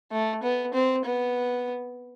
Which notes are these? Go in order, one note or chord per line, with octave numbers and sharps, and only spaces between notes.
A3
B3
C4
B3